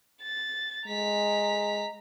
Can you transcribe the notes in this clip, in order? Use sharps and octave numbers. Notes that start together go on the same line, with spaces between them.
A6
G#3 A#5 B6